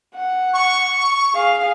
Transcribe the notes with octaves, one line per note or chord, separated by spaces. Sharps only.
F#5
C#6
G#4 F5